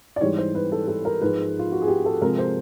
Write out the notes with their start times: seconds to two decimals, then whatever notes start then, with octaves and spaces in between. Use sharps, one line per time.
0.16 D5
0.21 G#2 E3 G3 C#5
0.37 C5
0.55 B4
0.72 A4
0.88 A4
1.05 A#4
1.21 G#2 F3 G#3 B4
1.59 F4
1.72 F#4
1.82 G#4
1.88 G4
2.05 A4
2.22 C3 F3 G#3 A#4
2.38 C5